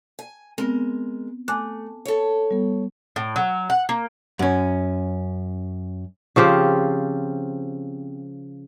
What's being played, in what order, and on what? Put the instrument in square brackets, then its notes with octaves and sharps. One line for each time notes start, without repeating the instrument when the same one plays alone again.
[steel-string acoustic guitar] G#5
[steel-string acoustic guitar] G#3 A#4 [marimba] B3 C4
[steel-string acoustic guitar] A3 [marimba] G#5 D6 F#6
[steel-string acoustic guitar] A4 C#5
[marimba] G3 B3
[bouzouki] A2
F#3
F#5
A#3
[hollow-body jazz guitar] F#2 C#4
[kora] C#3 F3 C4 G4